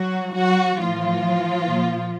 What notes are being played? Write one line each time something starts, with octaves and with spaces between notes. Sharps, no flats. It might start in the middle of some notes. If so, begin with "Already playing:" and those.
Already playing: F#3 F#4
F#3 F#4
A2 E3 F3 F4
A#2